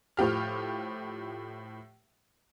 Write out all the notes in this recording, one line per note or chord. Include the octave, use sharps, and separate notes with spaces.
A2 F3 G4 F6